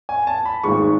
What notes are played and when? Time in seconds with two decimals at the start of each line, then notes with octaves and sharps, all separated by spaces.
0.09 G#5
0.27 A5
0.45 B5
0.64 G#1 G#2 G#3 C#6